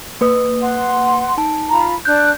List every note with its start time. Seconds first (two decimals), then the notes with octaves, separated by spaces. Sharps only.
0.21 A#3 B4 D#6
0.61 F#5 C6
1.38 D#4 A5
1.69 F4 A#5 B5
2.05 D4 F#6 G6